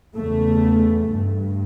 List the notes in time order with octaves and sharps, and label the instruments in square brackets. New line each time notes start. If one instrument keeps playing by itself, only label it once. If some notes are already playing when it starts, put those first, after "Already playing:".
[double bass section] E2 C#3 A3
G2